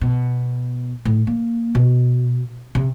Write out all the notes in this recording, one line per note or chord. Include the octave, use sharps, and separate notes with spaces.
B2
A2
A#3
B2
C3